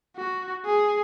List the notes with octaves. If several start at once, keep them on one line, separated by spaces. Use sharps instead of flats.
F#4
G#4